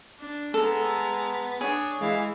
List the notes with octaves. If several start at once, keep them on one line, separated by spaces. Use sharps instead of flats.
D4
G#3 B3 A4 A#5
D4 G#4 C#5
E3 G#3 E4 F5